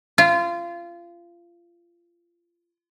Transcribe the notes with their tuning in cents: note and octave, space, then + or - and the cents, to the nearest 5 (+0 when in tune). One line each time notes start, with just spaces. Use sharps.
F4 -25